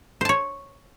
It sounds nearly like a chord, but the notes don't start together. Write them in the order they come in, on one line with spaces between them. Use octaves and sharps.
C5 A5 C#5